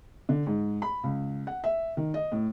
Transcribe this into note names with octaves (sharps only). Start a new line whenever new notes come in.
D3
G#2
B5
C#2
F#5
E5
D#3
D#5
A2